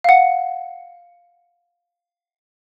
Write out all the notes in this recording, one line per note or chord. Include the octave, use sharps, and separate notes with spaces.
F5 F#5